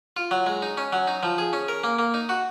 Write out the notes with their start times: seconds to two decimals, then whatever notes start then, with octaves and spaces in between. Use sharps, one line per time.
0.17 F4
0.31 F#3
0.46 G#3
0.62 D#4
0.77 C#4
0.93 F#3
1.07 D#4
1.23 F3
1.38 G#4
1.53 C#4
1.68 A#4
1.84 A#3
1.99 A#3
2.14 D#4
2.29 F#4